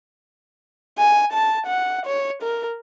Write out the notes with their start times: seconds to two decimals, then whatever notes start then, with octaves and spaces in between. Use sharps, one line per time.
0.98 G#5
1.33 A5
1.67 F#5
2.06 C#5
2.43 A#4